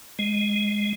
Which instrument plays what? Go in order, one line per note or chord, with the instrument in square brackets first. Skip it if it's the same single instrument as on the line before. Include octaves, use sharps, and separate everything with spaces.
[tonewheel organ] G#3